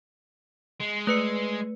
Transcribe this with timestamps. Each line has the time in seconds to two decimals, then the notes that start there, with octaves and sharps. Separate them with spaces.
0.81 G#3
1.07 A3 B4 C#7